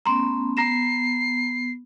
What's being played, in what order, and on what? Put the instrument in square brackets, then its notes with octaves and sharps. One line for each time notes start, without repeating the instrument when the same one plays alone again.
[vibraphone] A3 B3 C#4 [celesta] A#5 C6
[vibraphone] B3 [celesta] A#5 A#6 E7 [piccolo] C7